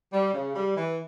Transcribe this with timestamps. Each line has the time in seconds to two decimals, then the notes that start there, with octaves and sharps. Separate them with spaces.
0.13 G3
0.34 C#3
0.55 G3
0.76 E3